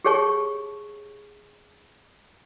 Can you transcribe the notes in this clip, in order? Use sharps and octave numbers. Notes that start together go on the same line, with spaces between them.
G4 G#4 C#5 A5 C#6